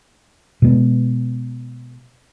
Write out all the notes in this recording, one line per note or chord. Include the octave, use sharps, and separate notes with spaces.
B2 G#3 B3